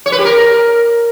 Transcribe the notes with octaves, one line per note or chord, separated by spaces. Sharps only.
C#5
B4
G4
A#4